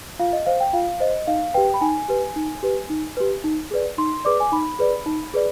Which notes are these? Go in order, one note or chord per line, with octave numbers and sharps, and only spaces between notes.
F4 F5
D#5
C5 F5
G5
F4 F5
C5 D#5
D#4 F5
G4 B4 G5
B5
D#4 G#5
G4 B4
D#4
G4 B4
D#4
G4 B4
D#4
G#4 B4 D5
D#4 C6
G#4 B4 D5 D6
G#5
D#4 B5
G#4 B4 D5
D#4
G#4 B4 D5